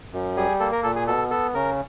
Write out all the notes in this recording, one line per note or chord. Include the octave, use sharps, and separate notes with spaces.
F#2
G3 G#4
A#3 A4
A#4
A#2 A4
G#4
B2 A4
B3 A4
C#3 A#4